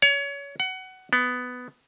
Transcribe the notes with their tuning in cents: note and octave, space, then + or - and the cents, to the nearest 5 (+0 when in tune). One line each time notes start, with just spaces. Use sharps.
C#5 +25
F#5 +20
B3 +10